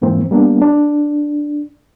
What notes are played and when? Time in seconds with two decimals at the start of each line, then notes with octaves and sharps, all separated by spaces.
0.02 F2 G#2 E3 A#3 C4
0.31 G3 A#3 B3 D4
0.62 D4